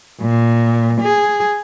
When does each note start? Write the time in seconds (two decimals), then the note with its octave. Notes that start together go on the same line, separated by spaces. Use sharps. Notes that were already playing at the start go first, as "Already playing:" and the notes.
0.22 A#2
1.01 G#4